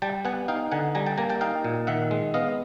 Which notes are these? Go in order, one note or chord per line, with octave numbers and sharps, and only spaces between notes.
G3 G5 A5
B3 F#5 G#5
D#4 F5 G5
D3 F#5 G#5
G3 G#5 A#5
G5 A5
A#3 G#5 A#5
G5 A5
D#4 F5 G5
A#2
D#3 E5 F#5
G#3
B3 D#5 F5